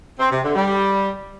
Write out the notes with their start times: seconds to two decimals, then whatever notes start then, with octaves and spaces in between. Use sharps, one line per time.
0.20 C4
0.32 C3
0.44 D3
0.56 G3